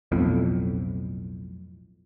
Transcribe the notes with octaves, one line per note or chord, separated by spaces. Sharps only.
B1 F2 A2